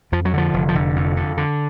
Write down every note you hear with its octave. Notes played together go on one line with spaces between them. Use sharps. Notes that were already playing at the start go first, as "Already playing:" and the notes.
F2 F3
F#3
D3 F3
F1
F3
F1 D3
F2
D3
D3